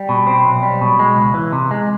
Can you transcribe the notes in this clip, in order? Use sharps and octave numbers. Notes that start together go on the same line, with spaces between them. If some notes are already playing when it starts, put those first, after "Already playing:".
Already playing: G3
B2
C4
B1
G3
B2
G#3
C#2
E3
C3
G#3